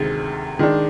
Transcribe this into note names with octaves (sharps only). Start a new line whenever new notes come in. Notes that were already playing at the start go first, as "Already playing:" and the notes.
Already playing: D2 C3 D#3 G#3
D#3 G#3 D4